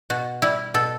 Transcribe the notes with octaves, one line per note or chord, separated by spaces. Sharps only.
B2 F#4
G3 E4
B2 A4